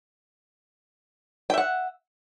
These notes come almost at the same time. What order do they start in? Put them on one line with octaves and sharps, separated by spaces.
G5 E5 F#5